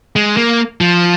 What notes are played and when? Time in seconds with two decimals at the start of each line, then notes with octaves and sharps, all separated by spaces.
0.16 G#3
0.37 A#3
0.81 F3